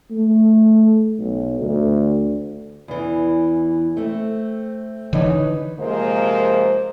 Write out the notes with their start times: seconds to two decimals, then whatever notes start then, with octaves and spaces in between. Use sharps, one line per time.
0.10 A3
1.18 B1
1.60 D2
2.88 E2 E3
3.97 A3 C4
5.13 D3 E3 D#4 B4 C#5
5.79 C3 F3 G#3 A#3 A#4 C5